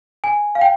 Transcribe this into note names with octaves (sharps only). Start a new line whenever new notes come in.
G#5
F5
G5